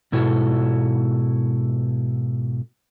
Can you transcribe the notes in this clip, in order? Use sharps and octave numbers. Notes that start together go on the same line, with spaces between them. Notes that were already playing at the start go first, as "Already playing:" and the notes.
G#2 B2 E4 F#4 A4